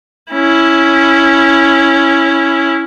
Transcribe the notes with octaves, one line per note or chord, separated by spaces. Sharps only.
C#4 E4